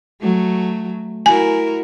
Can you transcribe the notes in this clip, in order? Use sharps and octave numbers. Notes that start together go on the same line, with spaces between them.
F#3 A3
E4 F#4 A#4 G#5